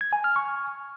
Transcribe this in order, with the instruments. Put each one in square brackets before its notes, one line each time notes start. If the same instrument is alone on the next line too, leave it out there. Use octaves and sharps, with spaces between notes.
[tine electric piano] G#6
G#5
F6
C#6